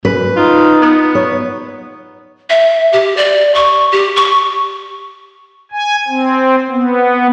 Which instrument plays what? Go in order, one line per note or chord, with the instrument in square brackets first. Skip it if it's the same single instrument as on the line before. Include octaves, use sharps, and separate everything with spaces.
[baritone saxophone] F#2 [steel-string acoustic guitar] B4
[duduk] D#4 [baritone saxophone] F4
[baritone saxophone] B3
[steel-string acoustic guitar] C#5
[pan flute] E5
G4
D5
C#6
G4
C#6
[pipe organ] G#5
C4
B3